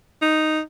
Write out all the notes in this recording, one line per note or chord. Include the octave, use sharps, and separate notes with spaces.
D#4